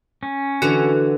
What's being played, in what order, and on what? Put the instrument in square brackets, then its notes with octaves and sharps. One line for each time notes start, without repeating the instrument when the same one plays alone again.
[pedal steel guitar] C#4
[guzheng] D3 E3 [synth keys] F#4